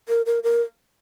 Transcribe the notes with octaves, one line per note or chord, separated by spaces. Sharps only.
A#4
A#4
A#4